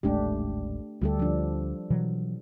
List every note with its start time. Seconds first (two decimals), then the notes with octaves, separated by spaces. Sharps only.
0.03 D#1 A1 G#3 A3 D4 G4
1.02 D2 G3 A3 G4 A4
1.19 F3 D4
1.90 B2 E3 F#3